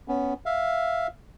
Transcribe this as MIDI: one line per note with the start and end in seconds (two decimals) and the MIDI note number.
0.08 0.34 59
0.08 0.34 61
0.46 1.07 76
0.46 1.07 77